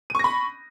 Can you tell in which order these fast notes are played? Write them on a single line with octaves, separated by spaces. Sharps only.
D#7 C#6 A#6 B5